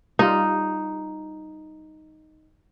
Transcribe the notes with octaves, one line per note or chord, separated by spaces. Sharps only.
G3 D#4 F4